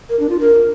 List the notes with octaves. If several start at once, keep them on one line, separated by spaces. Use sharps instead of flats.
A#4
D4
F4
A#4